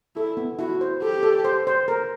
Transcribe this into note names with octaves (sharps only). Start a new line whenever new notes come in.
E4 A4
B3
E4 F#4
C5
G4 A4
A4
C5
C5
A#4